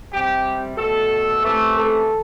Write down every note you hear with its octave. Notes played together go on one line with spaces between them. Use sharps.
C3 G3 G4
B2 A3 A4
C3 E3 A3
A4